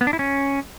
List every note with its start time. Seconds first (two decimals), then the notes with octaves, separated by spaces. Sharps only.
0.01 B3
0.07 D4
0.13 E4
0.19 C#4